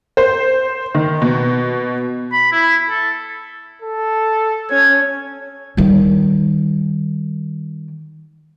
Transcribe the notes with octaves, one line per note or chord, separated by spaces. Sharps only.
C5
D#3
B2
B5
E4
A4
A4
C#4 G#6
D#3 G3